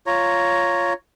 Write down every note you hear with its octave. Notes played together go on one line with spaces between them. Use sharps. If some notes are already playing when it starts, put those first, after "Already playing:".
F4 C#5 A#5